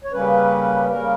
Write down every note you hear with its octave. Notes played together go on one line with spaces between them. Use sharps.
C#5
C#3 G3 A#3 C#4 B4
C#3 G3 A#3 C#4 A#4